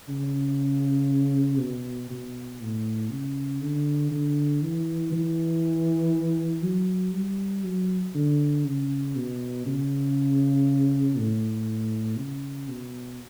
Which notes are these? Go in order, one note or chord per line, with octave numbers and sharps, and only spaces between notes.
C#3
B2
B2
A2
C#3
D3
D3
E3
E3
F#3
G3
F#3
D3
C#3
B2
C#3
A2
C#3
B2